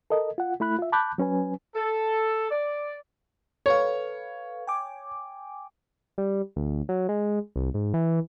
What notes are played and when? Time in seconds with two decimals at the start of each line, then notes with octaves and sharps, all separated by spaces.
0.10 A4 A#4 D#5
0.38 F4 F#5
0.60 A3 E4 B5 F#6
0.79 F4 E5
0.92 A5 B5 D6 F#6 G6
1.18 F#3 C#4 B4 G#5
1.75 A4
2.51 D5
3.66 A4 B4 C#5 F5
4.67 G5 G#5 D6
6.18 G3
6.56 D2
6.89 F#3
7.09 G#3
7.56 C2
7.74 G#2
7.94 E3